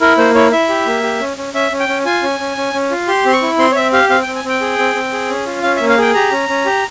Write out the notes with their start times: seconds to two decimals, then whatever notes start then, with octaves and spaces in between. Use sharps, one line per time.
0.01 E4 A#4
0.18 A#3 C5
0.35 E4 C#5
0.52 E4 E5
0.69 G4
0.86 A#3
1.03 G4
1.20 C#4
1.37 C#4
1.54 C#4 E5
1.72 C#4
1.80 G5
1.88 C#4
2.05 F4 G#5
2.23 C#4
2.40 C#4
2.57 C#4
2.73 C#4
2.91 F4
3.07 G4 C6
3.25 C4 C6
3.33 C#6
3.42 E4
3.58 C4 C6
3.72 C#5
3.76 C4 E5
3.93 G4 F5
4.10 C4 F5
4.23 G5
4.27 C4
4.35 G#5
4.44 C4 G5
4.61 G#4
4.78 C4
4.95 C4
5.13 G#4
5.29 C#4
5.46 F4
5.63 C#4 F5
5.76 E5
5.81 A#3
5.89 F5
5.98 G#4 G5
6.14 G4 A#5
6.31 C#4
6.49 C#4
6.66 G4